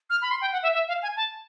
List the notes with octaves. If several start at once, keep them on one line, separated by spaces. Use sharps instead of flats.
F6
B5
C6
G5
F#5
E5
E5
F5
G#5
A5